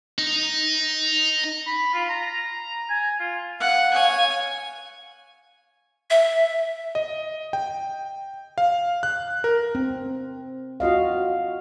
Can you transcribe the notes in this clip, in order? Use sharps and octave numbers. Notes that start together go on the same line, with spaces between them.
D#4
B5
F4
A#5
G#5
F4
F5 F#5
C#5 G#5
E5
D#5
G5
F5
F#6
A#4
C4
F4 F#4 D#5 F5